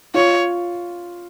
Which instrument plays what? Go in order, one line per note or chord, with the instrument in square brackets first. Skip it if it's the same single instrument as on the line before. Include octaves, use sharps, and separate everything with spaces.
[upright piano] F4 [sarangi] C#5